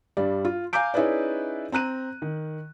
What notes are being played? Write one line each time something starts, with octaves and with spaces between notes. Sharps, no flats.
G2 G3 D5
F4
F5 G#5 A#5 D6 G6 D7
C#4 D#4 E4 G#4 B4 D5
C4 A#5 F#6 D#7
D#3